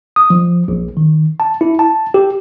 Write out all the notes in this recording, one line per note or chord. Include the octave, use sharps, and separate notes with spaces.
D#6
F3
A#1
D#3
A5
E4
A5
G4